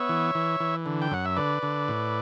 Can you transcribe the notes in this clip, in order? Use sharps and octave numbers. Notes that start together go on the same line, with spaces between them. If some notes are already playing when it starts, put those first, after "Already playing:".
Already playing: B3 C#5 E5
E3
E3
E3
D3
G5
F#2 F#5
E5
D3 B4 D5
D3
A2